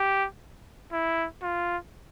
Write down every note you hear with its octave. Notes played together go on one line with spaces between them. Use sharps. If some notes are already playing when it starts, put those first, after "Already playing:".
Already playing: G4
E4
F4